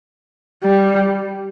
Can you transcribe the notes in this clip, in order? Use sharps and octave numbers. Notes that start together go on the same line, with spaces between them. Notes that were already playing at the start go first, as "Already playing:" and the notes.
G3